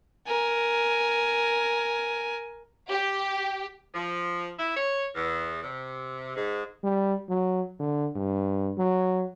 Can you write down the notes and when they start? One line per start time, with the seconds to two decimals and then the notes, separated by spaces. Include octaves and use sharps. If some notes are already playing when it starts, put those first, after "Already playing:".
0.27 A#4 G#5
2.90 G4
3.95 F3
4.59 E4
4.77 C#5
5.16 E2
5.64 C3
6.36 G#2
6.84 G3
7.29 F#3
7.80 D3
8.16 G2
8.78 F#3